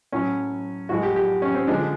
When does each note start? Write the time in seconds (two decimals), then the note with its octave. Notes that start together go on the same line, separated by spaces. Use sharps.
0.12 A2 F#3 C#4
0.89 A2 F3 G#3 F#4
1.03 G4
1.16 G4
1.42 C#4
1.55 C4
1.67 D3 F3 G#3 D4